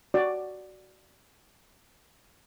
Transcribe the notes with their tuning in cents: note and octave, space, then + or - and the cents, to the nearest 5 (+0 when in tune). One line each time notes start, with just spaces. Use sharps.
F#4 +10 D5 +0